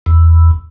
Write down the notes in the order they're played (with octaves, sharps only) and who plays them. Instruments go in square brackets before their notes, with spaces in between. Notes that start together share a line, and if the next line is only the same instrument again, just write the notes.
[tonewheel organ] E2